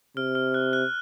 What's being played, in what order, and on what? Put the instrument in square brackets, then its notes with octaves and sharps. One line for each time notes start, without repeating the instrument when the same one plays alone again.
[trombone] C3 [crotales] F6
[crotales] F6
F#6
F#6